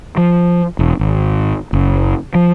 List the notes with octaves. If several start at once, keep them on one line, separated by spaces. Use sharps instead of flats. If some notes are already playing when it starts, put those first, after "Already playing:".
F3
E1
G#1
F#1
F3